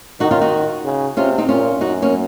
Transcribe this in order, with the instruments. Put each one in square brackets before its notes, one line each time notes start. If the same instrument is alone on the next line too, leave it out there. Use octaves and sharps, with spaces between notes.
[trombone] D#3 [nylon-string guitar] D#4 F#4
[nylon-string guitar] C#4 F4
D#4 F#4
[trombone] C#3
[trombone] C3 [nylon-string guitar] C#4 F4
[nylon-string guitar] C4 D#4
[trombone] A#2 [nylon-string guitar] C#4 F4
[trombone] F#2 [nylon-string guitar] D#4 F#4
[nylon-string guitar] A#3 C#4